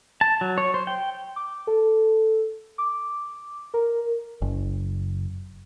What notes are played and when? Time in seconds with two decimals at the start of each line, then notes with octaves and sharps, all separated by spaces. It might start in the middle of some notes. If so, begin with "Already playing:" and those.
0.21 A5
0.41 F#3
0.58 C#5
0.74 C5
0.87 G5
1.36 D6
1.67 A4
2.78 D6
3.74 A#4
4.42 F#1